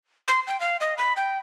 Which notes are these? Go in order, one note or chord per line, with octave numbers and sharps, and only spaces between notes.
C6
G5
F5
D#5
B5
G5